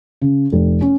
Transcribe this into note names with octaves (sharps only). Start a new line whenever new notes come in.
C#3
F1
C#4